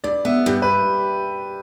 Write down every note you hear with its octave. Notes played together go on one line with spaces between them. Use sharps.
G2 D5
B3 E5
G2 G4
B4